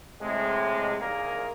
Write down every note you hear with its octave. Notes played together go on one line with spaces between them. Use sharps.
A2 C3 G#3
C2 D#3 A#3 G#4 A#4